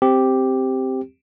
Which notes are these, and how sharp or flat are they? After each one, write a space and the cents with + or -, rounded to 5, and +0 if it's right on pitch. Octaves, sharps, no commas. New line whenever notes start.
C4 +0 G4 +0